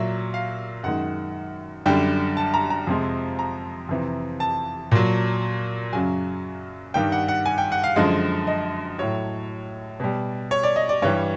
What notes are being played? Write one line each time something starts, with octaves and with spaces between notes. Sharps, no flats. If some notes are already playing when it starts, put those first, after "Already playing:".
Already playing: A#2 F#3 E5
F5
F#2 D#3 G#3 F#5
F#2 D3 G3 G5
A5
A#5
A#5
F2 C3 F3 G#3
A#5
F2 C3 E3
A5
A#2 F#3
F#2 C#3 F#3 G#5
G2 D#3 G3 G5
F#5
F#5
G#5
G5
F#5
F5
F#2 D3 F3 G#3 D#5
D#5
A2 F#3 C#5
B2 G3
C#5
D5
D#5
D5
G2 E3 G3 C#5